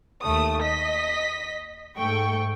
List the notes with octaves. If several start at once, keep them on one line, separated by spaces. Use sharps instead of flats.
D#2 A3 D#6
D#5 B6
G#2 A3 G5 C#6